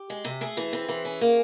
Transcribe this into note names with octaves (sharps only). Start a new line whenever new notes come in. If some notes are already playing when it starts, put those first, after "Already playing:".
Already playing: G4
G#3
C3
A3 G#4
E3
C4
E3
C#4
A#3